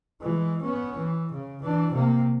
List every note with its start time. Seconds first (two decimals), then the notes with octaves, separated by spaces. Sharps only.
0.22 E3 G#3
0.62 B3 C#4
0.97 E3
1.32 C#3
1.63 E3 D4
1.93 C3 A#3